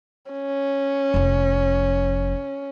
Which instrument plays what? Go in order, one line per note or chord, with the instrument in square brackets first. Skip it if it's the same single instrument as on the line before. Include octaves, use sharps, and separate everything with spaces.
[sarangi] C#4
[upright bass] F1 F2